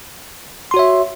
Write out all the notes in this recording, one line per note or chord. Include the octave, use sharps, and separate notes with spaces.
F#4 C#5 E5 C6